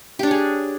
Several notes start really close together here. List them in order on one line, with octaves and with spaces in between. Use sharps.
G4 D4 C#5 G#4